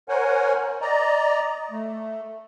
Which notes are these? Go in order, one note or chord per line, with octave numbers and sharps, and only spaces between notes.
A#4 C5 C#5 F#5 G#5
D5 D#5 A#5
A3